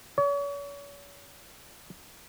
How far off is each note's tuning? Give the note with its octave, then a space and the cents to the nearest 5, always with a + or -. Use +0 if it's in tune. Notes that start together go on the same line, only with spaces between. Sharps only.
C#5 +40